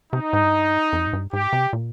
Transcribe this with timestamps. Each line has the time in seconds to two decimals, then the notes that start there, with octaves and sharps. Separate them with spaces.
0.13 C3 D#4
0.33 G#2
0.43 G2
0.93 F2
1.07 G#2
1.13 G2
1.33 G#2 G4
1.53 C3
1.73 A#2